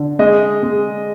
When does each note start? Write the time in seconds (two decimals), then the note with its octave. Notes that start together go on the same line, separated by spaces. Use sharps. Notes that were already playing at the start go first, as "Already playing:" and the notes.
Already playing: D3
0.19 G#3 D#5
0.63 G#3